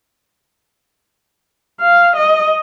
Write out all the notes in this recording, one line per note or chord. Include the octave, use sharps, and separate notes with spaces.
F5
D#5